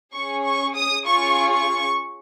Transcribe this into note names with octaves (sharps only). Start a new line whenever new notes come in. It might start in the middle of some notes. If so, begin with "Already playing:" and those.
C#4 G#4 C#6
C#6
D#6
C#4 F4 G#4 C#6
C#6